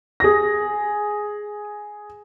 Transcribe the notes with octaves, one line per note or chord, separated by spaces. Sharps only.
G#4 A#6